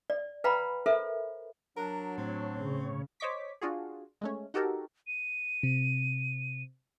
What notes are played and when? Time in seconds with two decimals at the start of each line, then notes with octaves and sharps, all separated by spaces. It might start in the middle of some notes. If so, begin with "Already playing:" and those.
0.10 D5
0.44 B4 F5 G5 A#5 B5
0.86 A4 A#4 C5 E5
1.77 F#3 D4 A#4
2.18 A2 C4 C#5
2.60 C#3
3.20 C5 C#5 D#5 C#6 D6 B6
3.61 D4 F4 F#4 G#4
4.21 G#3 A3 C#4
4.54 D#4 F#4 G4 A4 A#4
5.07 D#7
5.63 C3